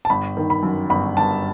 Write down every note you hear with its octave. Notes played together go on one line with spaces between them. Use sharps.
A5
G1 B5
D#3
B5
F#2
G1 B5
G1 A5